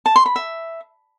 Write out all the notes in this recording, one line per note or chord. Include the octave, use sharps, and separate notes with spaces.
A5
C6
B5
E5